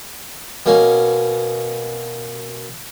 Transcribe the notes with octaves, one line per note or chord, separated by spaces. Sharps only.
B2 A#3 C#4